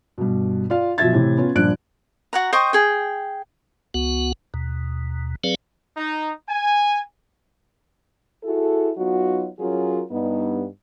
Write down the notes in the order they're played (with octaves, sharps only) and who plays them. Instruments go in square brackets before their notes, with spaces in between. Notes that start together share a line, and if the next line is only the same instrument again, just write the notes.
[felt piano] G2 B2
F4 D5 F5
B2 F3 F#3 E5 G#6 A6
A2 C3 E3
B3 C#4 F4
A#1 G2 A#2 D4 F#6 D7
[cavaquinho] F#4 F#5 A#5
C5 D#5 G5 C#6
G#4 G5
[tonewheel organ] C#2 B3 F#4 F#5
D#2 B2
F#3 C4 G#4 B4 D5 F5
[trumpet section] D#4
G#5
[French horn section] E4 F#4 G#4 A4
F#3 B3 D#4 F4 F#4
F#3 C#4 F4 F#4 G#4 A#4
G2 B3 D#4